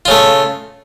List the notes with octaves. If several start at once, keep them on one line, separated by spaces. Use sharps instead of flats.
C#3 A3 F4